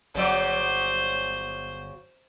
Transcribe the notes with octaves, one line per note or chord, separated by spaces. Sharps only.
G1 C#3 F#3 C5 D5